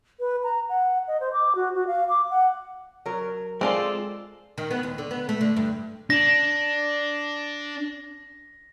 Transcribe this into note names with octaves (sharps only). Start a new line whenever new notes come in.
B4
A#5
F#5
D#5
C5
D6
F#4
F#4
F5
D6
F#5
F#3 A#4
G#3 C4 F4 A4 D5
D#3
B3
D#2
D3
B3
A3
D3
G2
D4 A#6